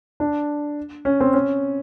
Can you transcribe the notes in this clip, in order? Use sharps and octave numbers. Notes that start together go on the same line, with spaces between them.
D4
C#4
C4
C#4